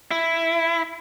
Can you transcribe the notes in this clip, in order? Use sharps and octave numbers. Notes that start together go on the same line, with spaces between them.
E4